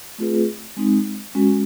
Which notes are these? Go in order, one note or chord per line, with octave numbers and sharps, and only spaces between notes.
A3 C4 F4 G#4 B4
G#3 C4 D#4
G#3 C#4 F#4